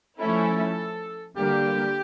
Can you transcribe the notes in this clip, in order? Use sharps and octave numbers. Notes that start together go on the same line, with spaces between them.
F3 A3 C#4 E4 A4
D3 G3 A#3 G4